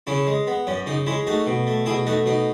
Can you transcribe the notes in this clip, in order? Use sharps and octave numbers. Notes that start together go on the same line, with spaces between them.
C#3 C#4 E4
G#3
B3
F#2 C#4
C#3 D#4
G#3 C#4 E4
A3 D#4 F#4
B2
A3
B2 E4 G#4
A3 D#4 F#4
B2 D#4